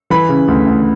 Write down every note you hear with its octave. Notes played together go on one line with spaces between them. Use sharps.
E3 B5
C#3
D2
D2